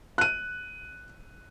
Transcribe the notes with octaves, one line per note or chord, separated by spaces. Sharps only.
F#6 D#7